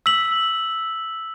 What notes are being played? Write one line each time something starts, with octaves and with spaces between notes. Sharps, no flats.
E6 B6 F#7